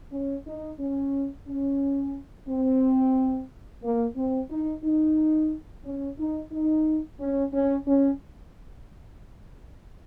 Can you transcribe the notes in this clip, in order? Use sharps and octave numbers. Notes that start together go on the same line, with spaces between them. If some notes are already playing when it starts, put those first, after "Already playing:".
C#4
D#4
C#4
C#4
C4
A#3
C4
D#4
D#4
C#4
D#4
D#4
C#4
C#4
C#4